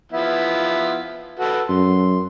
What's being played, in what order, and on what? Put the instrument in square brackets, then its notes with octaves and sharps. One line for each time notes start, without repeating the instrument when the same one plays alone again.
[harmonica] F3 B3 E4
F#4 A4 B4
[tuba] F#2 [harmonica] C6